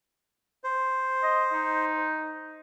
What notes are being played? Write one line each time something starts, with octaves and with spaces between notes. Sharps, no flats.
C5
D#5
D#4